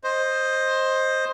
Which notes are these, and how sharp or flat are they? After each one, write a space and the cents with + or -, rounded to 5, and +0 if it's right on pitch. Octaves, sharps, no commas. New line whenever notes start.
C5 +15 D#5 +0